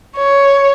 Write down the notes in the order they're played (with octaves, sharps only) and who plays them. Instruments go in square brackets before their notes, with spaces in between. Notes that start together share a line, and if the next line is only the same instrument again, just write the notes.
[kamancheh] C#5